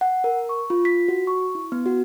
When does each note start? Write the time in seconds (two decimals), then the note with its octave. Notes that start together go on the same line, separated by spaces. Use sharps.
0.01 F#5
0.24 A#4
0.49 C#6
0.70 F4
0.85 B6
1.08 F#4
1.27 C#6
1.55 E4
1.72 B3
1.86 F#4